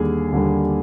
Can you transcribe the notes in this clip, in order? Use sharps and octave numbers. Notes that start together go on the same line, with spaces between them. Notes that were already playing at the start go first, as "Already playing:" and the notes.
Already playing: D#2 D3 G3 G#4
D#2 D3 G3